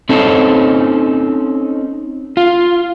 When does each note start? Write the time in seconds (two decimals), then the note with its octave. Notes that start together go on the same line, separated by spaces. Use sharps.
0.09 C4 C#4 D#4 A4
2.37 F4